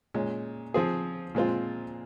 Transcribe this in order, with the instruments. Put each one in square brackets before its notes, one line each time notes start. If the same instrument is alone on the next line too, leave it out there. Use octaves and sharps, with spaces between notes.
[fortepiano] A#2 G#3 C#4
F3 C4 F4 G#4
A#2 G#3 C4 F4